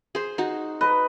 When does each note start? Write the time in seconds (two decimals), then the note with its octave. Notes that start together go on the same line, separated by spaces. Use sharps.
0.15 G#4 C5
0.38 D#4 F#4
0.81 B4 D#5